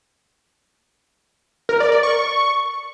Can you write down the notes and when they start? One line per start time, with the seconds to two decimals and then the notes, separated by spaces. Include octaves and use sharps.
1.69 A#4
1.80 D5
1.92 D5
2.03 C#6